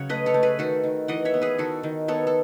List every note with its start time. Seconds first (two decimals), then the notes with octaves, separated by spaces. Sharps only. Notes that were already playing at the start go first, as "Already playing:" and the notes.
Already playing: C#3 F#3 C#5 F#5
0.09 A3 B4 D#5
0.26 A4 C#5
0.34 A3
0.43 G#4 B4
0.59 D#3 F#4 A4
0.84 D#3
1.08 E3 D#5 F#5
1.25 C#5 E5
1.34 B3
1.42 G#4 B4
1.58 D#3 F#4 A4
1.83 D#3
2.08 B3 A4 C#5
2.27 A4